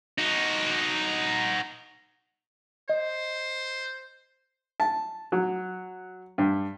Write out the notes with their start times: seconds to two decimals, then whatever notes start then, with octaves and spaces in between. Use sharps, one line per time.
0.18 D#4 F#4
2.89 C5 D#5
4.80 A5
5.32 F#3
6.38 G2